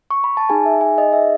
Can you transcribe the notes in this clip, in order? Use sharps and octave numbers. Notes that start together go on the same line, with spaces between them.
C#6
B5
A5
D#4 G#4 G#5
E5
G#5
D#5
E5